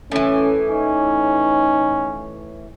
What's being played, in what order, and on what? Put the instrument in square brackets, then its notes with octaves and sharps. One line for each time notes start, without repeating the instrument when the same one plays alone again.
[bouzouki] A2 E3 [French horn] C#4
[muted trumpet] C#4 [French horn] D#4